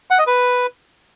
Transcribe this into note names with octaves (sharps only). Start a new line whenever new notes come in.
F#5
D#5
B4